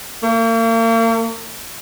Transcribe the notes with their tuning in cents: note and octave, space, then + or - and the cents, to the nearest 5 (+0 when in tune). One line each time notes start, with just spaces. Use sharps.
A#3 -40